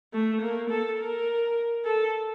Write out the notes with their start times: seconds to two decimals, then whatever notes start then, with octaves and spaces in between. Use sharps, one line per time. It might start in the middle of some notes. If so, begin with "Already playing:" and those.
0.13 A3
0.41 A#3
0.70 A4
0.99 A#4
1.85 A4